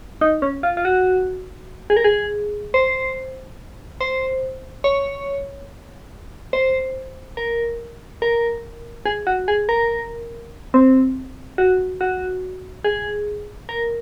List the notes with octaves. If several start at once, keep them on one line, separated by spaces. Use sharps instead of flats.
D#4
C#4
F4
F4
F#4
G#4
A#4
G#4
C5
C5
C#5
C5
A#4
A#4
G#4
F#4
G#4
A#4
C4
F#4
F#4
G#4
A#4